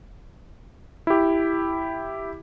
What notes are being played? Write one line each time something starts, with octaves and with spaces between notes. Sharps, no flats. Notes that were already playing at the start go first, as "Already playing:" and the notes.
E4 G4